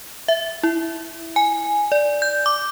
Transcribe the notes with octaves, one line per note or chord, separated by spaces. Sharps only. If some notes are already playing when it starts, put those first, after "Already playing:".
E5
E4
G#5
D5
G6
D6